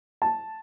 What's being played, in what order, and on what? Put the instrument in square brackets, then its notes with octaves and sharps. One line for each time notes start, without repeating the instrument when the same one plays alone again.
[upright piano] A5